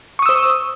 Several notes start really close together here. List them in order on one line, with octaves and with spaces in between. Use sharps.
C#6 D#6 E6 C5